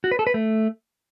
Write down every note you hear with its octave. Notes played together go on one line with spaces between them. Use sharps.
F#4
B4
A4
B4
A3